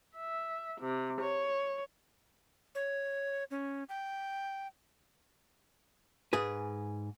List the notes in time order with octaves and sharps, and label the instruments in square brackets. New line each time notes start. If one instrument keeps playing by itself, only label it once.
[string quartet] E5
C3
C#5
[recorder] C#5
C#4
G5
[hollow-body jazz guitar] G#2 G#4 B4